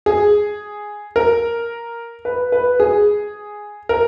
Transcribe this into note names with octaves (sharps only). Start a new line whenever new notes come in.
G#4
A#4
B4
B4
G#4
A#4